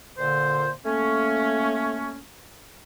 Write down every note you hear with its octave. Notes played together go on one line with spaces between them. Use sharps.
A#2 D3 C5
A3 A#3 C#4